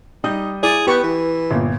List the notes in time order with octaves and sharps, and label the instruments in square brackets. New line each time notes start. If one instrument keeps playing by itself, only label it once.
[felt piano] G3 D#6 G6 [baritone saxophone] D#4
[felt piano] E4 [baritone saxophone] G#4 [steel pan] D5
[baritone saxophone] B3 [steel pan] G4 B4 C#6
[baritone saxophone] E3
[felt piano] G1 A#2